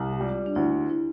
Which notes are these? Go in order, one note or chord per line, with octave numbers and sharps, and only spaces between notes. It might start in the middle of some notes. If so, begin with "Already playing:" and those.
Already playing: C2
G4
G3 F4
D4
D2 E4
E4